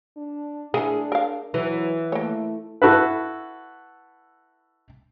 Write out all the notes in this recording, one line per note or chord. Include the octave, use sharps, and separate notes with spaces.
D4
E3 A3 D4 G#4 A#4
A#4 F5
E3 F#3
A3 A#3 C#5
E4 F#4 A4 B4